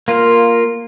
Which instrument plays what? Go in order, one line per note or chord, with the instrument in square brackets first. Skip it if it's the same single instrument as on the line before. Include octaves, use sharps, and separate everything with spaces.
[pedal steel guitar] A#3 F4